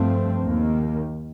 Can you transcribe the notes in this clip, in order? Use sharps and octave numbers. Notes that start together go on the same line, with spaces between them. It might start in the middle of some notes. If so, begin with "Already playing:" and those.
Already playing: G2 F3 A3 C4
D#2 D#3 A#3